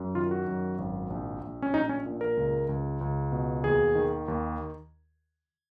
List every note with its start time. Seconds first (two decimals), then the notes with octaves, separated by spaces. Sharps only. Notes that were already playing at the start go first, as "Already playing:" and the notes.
Already playing: F#2
0.15 D#3 F4
0.31 F#4
0.48 F#2
0.78 G#1
1.10 A#1
1.42 A#1
1.62 C#4
1.74 A#1 D#4
1.89 C#4
2.06 A#2
2.21 A#4
2.37 C#2
2.69 C#2
3.01 C#2
3.32 B2
3.64 D#2 G#4
3.95 D#3
4.28 D#2